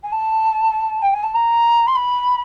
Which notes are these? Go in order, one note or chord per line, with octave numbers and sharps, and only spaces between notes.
G#5
A5
G5
G#5
A5
A#5
C6
B5